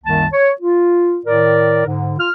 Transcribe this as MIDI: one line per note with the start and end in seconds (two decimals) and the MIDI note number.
0.04 0.26 36
0.04 0.26 42
0.04 0.26 51
0.04 0.26 58
0.04 0.26 81
0.33 0.49 73
0.61 1.18 65
1.25 1.82 45
1.25 1.82 51
1.25 1.82 70
1.25 1.82 74
1.85 2.15 44
1.85 2.15 50
2.18 2.30 65
2.18 2.30 89